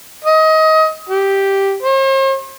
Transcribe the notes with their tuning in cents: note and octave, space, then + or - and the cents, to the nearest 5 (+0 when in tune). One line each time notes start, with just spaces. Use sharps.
D#5 +25
G4 +0
C5 +45